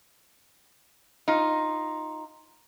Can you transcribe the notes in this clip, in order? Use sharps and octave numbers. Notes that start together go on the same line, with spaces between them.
D#4 F4